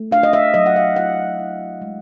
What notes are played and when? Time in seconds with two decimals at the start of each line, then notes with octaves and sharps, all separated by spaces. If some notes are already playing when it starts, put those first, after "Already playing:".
Already playing: A3
0.11 D4 F5
0.23 D#5
0.33 E5
0.54 F#3 D#5
0.66 F#5
0.76 F5
0.96 E4 F#5
1.39 E4
1.82 G#3